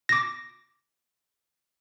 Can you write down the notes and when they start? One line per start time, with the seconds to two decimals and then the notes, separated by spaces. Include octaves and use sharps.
0.09 D6 A#6